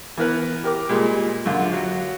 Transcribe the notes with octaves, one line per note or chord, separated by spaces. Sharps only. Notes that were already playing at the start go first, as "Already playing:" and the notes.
E3 B3 A#4 B4
G4 A#4 D6
A#2 G3 G#3
F#2 D3 F4
F#3